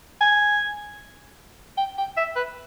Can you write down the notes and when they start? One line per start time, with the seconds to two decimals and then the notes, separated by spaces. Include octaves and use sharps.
0.21 G#5
1.77 G5
1.98 G5
2.17 E5
2.36 B4